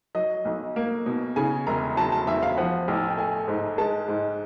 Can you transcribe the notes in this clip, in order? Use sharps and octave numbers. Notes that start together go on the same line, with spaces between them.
F#3 D#5
B1
A#3
B2
C#3 G#5
E1 A#5
F#3 A5
A5
E2 E5
F5
F3 F#5
A1
G5
A3 G#5
G#2
G#3 A5
G#2